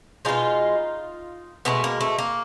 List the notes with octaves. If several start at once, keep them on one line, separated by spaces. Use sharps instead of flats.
B2 G#3 D#4 F4
B2 G#3 A3 B3
A#3
A3
A#3